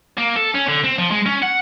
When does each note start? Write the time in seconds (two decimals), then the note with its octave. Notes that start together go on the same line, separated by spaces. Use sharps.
0.18 A#3
0.36 A4
0.54 C#4
0.68 D3
0.84 C4
0.99 F3
1.11 G#3
1.26 C#4
1.42 F#5